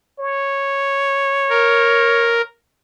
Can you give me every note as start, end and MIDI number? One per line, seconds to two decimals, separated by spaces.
0.20 2.45 73
1.50 2.42 70